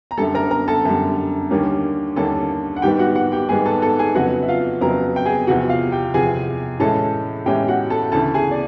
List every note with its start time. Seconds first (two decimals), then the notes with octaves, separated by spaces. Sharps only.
0.11 A#5
0.18 F#2 D3 G3 A4 A5
0.35 A#4 A#5
0.51 A#4 A#5
0.68 A4 A5
0.85 F#2 D3 G3
1.50 D#2 D3 G3 A#3 C#4
2.16 D#2 D3 G3 A#3 C#4 A4 A5
2.76 F#5
2.82 G#2 D#3 G3 B3 G4 G5
2.99 F#4 F#5
3.15 F#4 F#5
3.32 G4 G5
3.49 G#2 D#3 G3 B3 G#4 G#5
3.66 A4 A5
3.82 A4 A5
3.99 G#4 G#5
4.15 F2 C#3 F#3 B3 F#4 F#5
4.42 E5
4.48 F4 F5
4.81 F2 C#3 F#3 B3 A#4 A#5
5.16 G5
5.25 G#4 G#5
5.47 E2 C3 F3 F#4 F#5
5.69 F4 F5
5.92 G4 G5
6.14 E2 C3 F3 G#4 G#5
6.79 A2 E3 G#3 C#4 A4 A5
7.46 A2 E3 G#3 C#4 G4 G5
7.68 F#4 F#5
7.90 A4 A5
8.12 D2 C#3 E3 A4 A5
8.34 G#4 G#5
8.51 D5